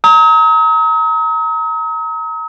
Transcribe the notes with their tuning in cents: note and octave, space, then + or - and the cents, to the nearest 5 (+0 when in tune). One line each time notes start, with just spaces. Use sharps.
A#5 -15 D#6 +45